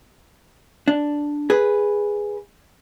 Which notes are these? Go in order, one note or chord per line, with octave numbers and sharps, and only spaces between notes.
D4
G#4 B4